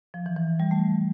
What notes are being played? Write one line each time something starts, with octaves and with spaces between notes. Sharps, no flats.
F3
E3
E3
G3
A3